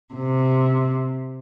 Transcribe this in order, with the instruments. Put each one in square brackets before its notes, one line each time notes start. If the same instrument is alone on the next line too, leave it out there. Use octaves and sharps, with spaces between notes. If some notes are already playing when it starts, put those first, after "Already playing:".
[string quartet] C3